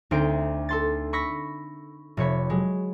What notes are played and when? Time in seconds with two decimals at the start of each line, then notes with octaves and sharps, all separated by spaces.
0.11 D2 C4 D#4 C5 D7
0.69 A4 C6 A6
1.13 B5 C#6 E6 A#6 B6
2.17 F1 C3 C#5 B5
2.50 F#3 G#3